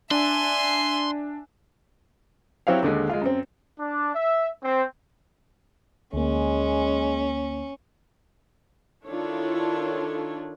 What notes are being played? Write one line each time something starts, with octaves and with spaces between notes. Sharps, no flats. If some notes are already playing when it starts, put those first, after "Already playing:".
D4 E5 G#5 C6
F#3 C4 E4 G4 C#5 F5
D#2 D3 G#3
G#3 F4
F#2 C4
D4
E5
C4
D2 G#3 A#3 C#4
D#3 D4 E4 F4 A4 C#5